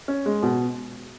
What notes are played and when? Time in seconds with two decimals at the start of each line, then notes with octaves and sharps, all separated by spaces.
0.08 C#4
0.26 G#3
0.43 B2